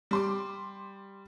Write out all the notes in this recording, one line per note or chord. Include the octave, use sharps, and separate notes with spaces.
G3 C6 D6